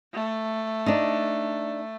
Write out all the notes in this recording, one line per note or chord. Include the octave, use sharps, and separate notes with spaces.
A3
D4 D#4